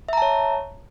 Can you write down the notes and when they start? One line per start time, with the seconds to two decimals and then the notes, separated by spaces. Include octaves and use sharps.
0.09 E5
0.13 A#5
0.17 A5
0.22 C#5